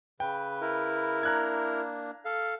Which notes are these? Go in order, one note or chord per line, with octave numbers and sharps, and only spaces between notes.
C#3 B4 G5
E4 A#4
A#3 D4 A#5 F#6 G#6
A4 F5